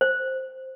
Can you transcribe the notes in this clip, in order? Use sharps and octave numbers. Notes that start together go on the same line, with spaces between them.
C5